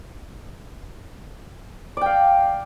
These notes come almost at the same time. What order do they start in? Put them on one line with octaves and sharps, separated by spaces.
D5 G5 F5